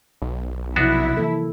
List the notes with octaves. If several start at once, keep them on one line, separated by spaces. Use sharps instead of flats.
B1
C3 F3 F#3 B3 D4 E4 F#4
E3 A#3 A4